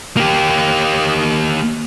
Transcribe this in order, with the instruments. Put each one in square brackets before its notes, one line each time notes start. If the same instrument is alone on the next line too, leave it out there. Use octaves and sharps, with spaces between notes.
[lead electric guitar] A#3 G4